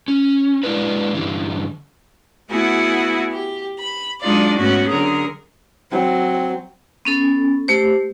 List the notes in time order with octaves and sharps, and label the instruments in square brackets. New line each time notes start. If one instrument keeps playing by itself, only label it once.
[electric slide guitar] C#4
G#3 D4 E4 A#4 B4
G2 D3 E3
[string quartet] A3 B3 E4 F#4 G#4
G4
B5
F#3 G#3 D4 D#4 F4 D5
G#2 A3 B3 C#4 F#4
D3 F#3 G#4 A#4
[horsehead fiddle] F#3 C4
[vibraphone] B3 C#4 A4
A3 G4 C5